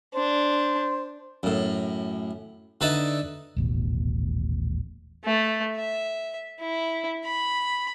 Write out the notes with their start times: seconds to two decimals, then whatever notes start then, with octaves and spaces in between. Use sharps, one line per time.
0.14 D4 C5
1.43 F#2 A2
2.81 D3 D#4 B4 E5 A5
3.57 D#1 A1 B2
5.25 A3
5.76 E5
6.60 E4
7.25 B5